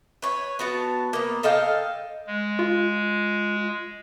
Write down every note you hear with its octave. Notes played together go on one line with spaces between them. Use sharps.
B4 C#5
B3 F#4 A5
A#3 B3
A4 D#5 F5 G5
G#3
F4